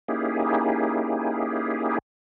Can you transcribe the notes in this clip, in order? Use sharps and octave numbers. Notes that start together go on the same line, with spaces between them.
A#3 C#4 D#4 E4 G4 G#4